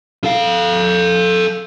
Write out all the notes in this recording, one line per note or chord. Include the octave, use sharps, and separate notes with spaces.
A4 F5